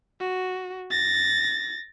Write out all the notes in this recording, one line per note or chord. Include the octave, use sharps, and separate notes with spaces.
F#4
A6 A#6